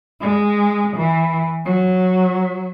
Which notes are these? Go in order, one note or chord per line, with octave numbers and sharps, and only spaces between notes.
G#3
E3
F#3